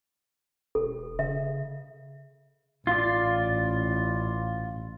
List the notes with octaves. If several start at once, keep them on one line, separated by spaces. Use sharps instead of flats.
E1 A4
C#3 E5
A1 F4 D5